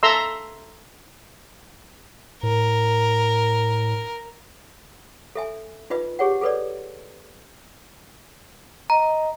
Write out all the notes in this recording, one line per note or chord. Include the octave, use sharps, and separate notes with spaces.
A4 E5 A#5 C6 E6
A2 A#4
A4 E5 G#5
D#4 F4 B4 D#5
G4 G#4 C#5 F#5
G#4 A4 B4 C#5 D5
D#5 A#5